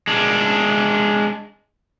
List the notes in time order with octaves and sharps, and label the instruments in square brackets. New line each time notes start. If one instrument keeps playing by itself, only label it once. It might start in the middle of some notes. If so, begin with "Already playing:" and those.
[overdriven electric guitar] G#3 D4